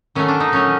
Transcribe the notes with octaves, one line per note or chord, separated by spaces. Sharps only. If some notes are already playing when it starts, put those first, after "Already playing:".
D#3 F#3 A3 C#4
D4
D#4
A#2 F#3 A3 C#4